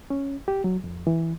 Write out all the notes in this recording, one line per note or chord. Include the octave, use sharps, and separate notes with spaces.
C#4
G4
F#3
F2
E3